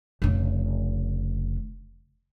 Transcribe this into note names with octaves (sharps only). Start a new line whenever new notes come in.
F1 C#3